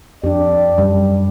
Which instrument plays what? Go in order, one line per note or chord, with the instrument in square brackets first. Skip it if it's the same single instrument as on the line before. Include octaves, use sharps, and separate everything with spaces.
[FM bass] F2 [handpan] D4 G4 [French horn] D5
[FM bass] F#2 [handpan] G3